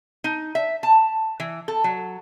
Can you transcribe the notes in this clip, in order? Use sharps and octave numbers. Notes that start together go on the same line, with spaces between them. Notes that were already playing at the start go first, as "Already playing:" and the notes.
D#4
E5
A5
E3
A4
F#3